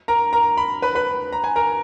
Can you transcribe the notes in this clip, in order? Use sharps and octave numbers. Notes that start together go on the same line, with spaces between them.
A#4 A#5
A#4 A#5
B5
B4 B5
B4 B5
A#5
G#5
A#4 A#5